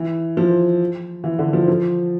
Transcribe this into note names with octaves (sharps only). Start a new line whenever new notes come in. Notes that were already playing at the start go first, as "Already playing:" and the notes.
Already playing: E3
F3
E3
D3
F3
F3